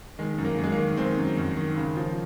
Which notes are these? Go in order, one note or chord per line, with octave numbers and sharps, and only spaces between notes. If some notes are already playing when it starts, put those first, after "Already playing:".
D#3 G#3
F#2
A#3
F#2
G#3
A#3
D#3
D#3 G#3 C4
F#2
F#2
D#3
C#3
F3